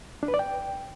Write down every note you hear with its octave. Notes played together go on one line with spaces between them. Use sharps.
D4
B4
D5
G5